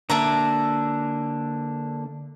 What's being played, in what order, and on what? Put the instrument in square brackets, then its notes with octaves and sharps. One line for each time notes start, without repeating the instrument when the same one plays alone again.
[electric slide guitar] D3 A#3 [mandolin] D4 E5 A#5